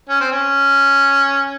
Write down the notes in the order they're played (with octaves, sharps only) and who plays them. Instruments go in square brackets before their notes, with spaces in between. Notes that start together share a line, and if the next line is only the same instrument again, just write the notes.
[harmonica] C#4
C4
C#4